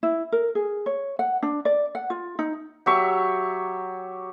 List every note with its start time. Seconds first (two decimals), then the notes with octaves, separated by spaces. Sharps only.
0.03 E4
0.32 A#4
0.55 G#4
0.86 C#5
1.19 F#5
1.43 D4
1.65 D5
1.95 F#5
2.10 F4
2.39 D#4
2.86 F#3 G4 E5 C#6